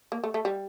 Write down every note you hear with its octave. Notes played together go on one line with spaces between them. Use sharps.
A#3
A3
A3
G3